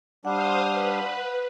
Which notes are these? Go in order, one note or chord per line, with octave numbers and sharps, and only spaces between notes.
G3 D4 C5 F5 F#5 D#6
B4